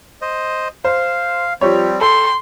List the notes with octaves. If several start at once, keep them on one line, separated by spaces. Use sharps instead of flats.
C5 D#5
C5 F5
F3 G3 C4 G4 C#5
A4 G5 C6